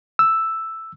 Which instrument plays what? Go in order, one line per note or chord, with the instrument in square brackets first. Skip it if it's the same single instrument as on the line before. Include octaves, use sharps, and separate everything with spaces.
[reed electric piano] E6